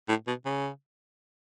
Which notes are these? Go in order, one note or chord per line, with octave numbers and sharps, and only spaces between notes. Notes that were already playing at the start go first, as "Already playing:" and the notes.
A2
B2
C#3